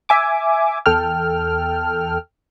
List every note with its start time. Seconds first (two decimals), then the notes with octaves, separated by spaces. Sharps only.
0.09 E5 G#5 D6
0.86 E2 A4 G5 F6